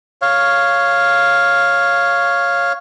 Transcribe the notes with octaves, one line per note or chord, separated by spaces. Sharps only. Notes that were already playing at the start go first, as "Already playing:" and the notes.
C#5 F5